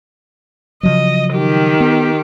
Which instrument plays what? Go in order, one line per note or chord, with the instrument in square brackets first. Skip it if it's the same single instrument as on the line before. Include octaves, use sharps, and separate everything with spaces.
[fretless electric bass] C#3 F3 F#3 [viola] D#5
[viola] D#3 G4
[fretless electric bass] B3